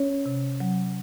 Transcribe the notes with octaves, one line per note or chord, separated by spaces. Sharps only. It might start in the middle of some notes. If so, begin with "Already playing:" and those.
Already playing: C#4 C#5
C3
F#3